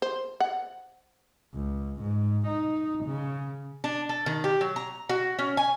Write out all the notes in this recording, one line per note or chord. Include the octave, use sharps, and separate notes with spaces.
C5
F#5
C#2
G#2
D#4
C#3
D4
A4
D#3
G4
F#3
A#5
F#4
C#4
G#5